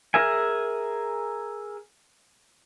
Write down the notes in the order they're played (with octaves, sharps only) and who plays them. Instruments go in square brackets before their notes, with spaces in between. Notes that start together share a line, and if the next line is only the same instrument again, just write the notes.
[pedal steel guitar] G#4 A#4 E5 G#5